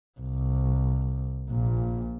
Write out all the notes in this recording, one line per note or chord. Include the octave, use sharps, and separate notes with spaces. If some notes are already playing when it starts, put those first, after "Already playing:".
C2
A#1 A#2